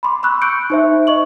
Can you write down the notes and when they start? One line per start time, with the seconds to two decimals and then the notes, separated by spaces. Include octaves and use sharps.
0.03 B5 C6 D6
0.23 B5 C#6 E6 F#6
0.42 C#6 F#6 G6 C#7 D7
0.70 D#4 C5 E5
1.07 D#5 C#6 F#7